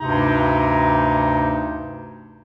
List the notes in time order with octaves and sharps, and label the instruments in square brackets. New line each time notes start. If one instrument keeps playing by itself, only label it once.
[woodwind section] D2 G2 C3 D#4